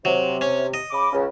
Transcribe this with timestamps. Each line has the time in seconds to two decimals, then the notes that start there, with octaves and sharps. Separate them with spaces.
0.05 C3 F#3
0.41 C#4
0.74 D#5
0.91 C#3 B5 D6
1.12 C#2 C#3